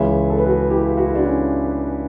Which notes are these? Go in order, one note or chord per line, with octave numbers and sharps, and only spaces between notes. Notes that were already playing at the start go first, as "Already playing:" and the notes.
Already playing: C#2 C#3 E3 C#5 E5
A4
B4
F#4 A4
E4 G4
F#4
E4
D4 F#4
C#4 E4